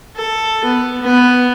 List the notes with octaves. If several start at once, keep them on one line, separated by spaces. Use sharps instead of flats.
A4
B3
B3